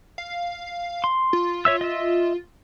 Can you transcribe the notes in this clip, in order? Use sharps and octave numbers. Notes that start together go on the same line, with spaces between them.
F5
C6
F4
C#5 E5 E6
D#5 E5